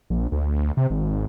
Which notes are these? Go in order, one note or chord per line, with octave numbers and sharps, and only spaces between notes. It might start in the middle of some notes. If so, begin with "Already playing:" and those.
A#1
D2
C3
G#1